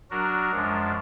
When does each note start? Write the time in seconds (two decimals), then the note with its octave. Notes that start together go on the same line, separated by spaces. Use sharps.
0.11 F#3 D4 F#4 A#4
0.52 F#2 F3 G#3 D4